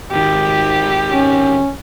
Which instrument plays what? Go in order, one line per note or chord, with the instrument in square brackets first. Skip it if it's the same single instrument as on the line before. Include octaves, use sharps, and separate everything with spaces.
[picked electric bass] G#1 D#3 [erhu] G4
[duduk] C#4